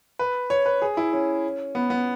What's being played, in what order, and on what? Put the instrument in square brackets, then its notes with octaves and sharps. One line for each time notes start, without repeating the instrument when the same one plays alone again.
[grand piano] B4
C#5
B4
G#4
E4
C#4
B3
B3